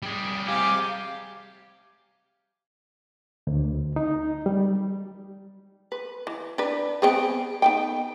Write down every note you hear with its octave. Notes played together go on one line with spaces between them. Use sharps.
G3 G#4
C3 G4 F5 G#5
D2
D#4
G3
B4
E3
D4 B4
B3 C4 G#4
B3 D#4 G5